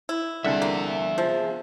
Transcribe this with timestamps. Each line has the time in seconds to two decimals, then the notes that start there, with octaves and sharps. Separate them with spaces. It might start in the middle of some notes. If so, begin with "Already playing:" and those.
0.09 E4
0.45 C2 D3 G#4 E5 F#5
0.62 A#3
1.18 F3